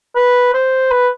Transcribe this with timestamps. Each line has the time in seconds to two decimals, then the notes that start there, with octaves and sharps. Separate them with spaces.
0.16 B4
0.54 C5
0.91 B4